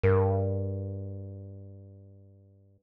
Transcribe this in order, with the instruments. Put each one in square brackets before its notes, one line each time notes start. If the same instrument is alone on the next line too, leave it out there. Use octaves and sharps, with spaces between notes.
[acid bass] G2 [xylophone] A#4